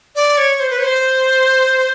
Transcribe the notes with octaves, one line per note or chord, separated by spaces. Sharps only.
D5
C#5
C5
B4
C#5
C5